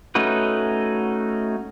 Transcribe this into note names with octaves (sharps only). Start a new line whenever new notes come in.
A3 C#4 D#4 F#4 B4